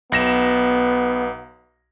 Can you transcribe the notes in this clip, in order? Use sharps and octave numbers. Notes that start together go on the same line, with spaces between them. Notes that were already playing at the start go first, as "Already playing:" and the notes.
B1 B3 A#6 E7